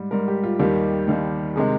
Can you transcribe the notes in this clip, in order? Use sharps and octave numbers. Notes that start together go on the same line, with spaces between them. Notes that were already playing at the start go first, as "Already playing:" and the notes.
Already playing: G#2 G3
G#2 G3 A#4
G4
F4
D#2 D#3 G3 G4
D#2 D#3 G3
C3 D#3 G#3 G#4